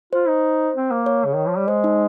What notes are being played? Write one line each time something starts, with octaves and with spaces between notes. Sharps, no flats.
F4 C5
D#4
C4
A#3
C#5
C#3
D#3
F3
G3
G#3 C5
D#4